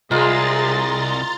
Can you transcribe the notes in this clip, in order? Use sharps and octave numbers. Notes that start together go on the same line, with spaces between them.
C2 G#3 F4 G#4 A#4 A#5 C6 A6